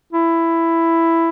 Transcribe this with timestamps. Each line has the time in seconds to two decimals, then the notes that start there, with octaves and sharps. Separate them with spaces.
0.13 E4